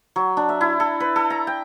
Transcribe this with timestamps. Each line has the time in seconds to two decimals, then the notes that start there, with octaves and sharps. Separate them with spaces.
0.16 F#3
0.37 D4
0.49 E5
0.61 E4
0.80 A4
1.00 B4
1.16 A4
1.30 A#5
1.47 G5